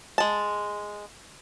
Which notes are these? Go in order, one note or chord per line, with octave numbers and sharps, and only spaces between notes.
G#3 A5